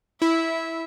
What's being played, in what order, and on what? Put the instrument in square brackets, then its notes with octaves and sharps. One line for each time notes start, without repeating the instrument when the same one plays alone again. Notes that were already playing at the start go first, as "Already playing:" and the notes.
[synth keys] E4 [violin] E5